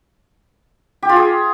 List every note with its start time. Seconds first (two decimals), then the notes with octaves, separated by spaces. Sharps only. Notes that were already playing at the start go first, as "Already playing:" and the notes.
1.03 G4
1.09 F4
1.16 G#4